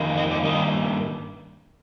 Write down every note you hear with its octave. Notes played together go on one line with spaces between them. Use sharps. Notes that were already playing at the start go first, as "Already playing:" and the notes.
Already playing: F2 D#3 A#3
D#5
D5
G2 D#3 A#3 D#5